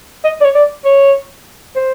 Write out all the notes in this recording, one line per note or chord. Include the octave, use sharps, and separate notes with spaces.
D#5
D5
C#5
D5
C#5
C5